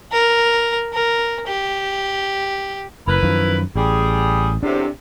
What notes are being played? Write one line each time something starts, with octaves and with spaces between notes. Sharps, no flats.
A#4
A#4
G4
F#1 E4 A#4 B4
F#2 D#3 F3
A1 G3 G#4
E2 A2 C3 D4